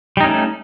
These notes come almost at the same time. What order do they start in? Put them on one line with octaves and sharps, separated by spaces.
G3 D#4 C#4 A3